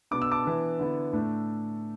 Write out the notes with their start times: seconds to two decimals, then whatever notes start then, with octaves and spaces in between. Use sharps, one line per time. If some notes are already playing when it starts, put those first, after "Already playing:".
0.11 B2 B3 D4 D6
0.22 E6
0.31 A5 D6
0.45 E3 B3 D4
0.79 D3 B3 E4
1.13 A2 A3 D4